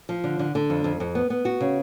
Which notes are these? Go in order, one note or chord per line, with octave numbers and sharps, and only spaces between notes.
F3
D3
D3
D3
F2
F2
F2
B3
B3
F#4
C#3